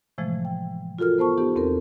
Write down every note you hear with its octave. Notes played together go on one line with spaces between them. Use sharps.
A2 C3 E3 F3 G#3 A3
G5
F4 F#4 A4 A#4 F6
B3 C5 A5 C#6
B3 D#4 G4
E2 C4 A4 A#4